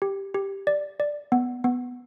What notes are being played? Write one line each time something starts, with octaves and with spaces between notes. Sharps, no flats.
G4
G4
D5
D5
B3
B3